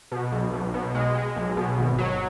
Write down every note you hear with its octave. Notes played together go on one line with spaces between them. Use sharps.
B2
B1
B1
B2
G#3
G#3
B1
B2
G#1
F#3